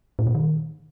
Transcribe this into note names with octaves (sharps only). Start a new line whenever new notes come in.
A2
A#2
D#3